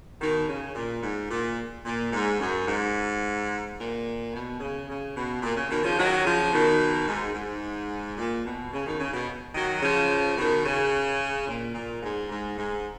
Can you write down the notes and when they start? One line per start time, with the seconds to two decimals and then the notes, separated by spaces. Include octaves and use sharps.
0.20 B2 D#3
0.47 C#3
0.75 A#2
1.03 G#2
1.30 A#2
1.85 A#2
2.12 G#2
2.40 F#2
2.68 G#2
3.77 A#2
4.32 B2
4.60 C#3
4.88 C#3
5.15 B2
5.42 A#2
5.56 C#3
5.70 B2 D#3
5.83 C#3 F3
5.97 D#3 F#3
6.25 C#3 F3
6.52 B2 D#3
7.07 G#2
7.34 G#2
8.17 A#2
8.44 B2
8.72 C#3
8.86 B2 D#3
8.99 C#3
9.13 B2
9.54 D#3 F#3
9.82 C#3 F3
10.37 B2 D#3
10.65 C#3
11.47 A#2
11.74 A#2
12.02 G#2
12.29 G#2
12.57 G#2